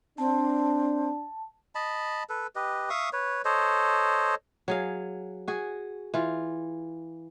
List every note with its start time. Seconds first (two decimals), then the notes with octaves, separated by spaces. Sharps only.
0.18 C4 D4 A5
1.75 D#5 A5 B5
2.29 A4 B4
2.55 G4 B4 D#5
2.90 E5 F5 C#6 D#6
3.13 B4 C#5
3.45 A4 C5 C#5 D#5
4.68 F#3 G#4 F5
5.48 F#4 G#4
6.14 E3 F4